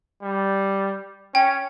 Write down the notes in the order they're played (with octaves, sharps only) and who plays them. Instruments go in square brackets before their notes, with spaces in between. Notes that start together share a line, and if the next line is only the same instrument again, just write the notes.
[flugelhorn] G3
[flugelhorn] C#4 [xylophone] G5